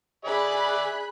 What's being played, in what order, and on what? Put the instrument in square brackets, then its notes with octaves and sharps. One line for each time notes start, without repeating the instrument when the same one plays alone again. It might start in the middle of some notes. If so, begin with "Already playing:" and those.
[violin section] G#4 B5 F#6 [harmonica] D5 E5